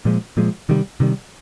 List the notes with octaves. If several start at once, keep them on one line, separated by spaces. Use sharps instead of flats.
A#2 F3 G#3
A#2 F3 G#3
C3 D#3 G3
C3 D#3 G3